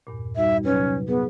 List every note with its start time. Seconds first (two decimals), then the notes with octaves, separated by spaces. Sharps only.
0.07 E2 G2 A#2
0.36 G3 D#4 F#4 E5
0.65 C3 F#3 C#4 B4
1.08 B3 G#4 B4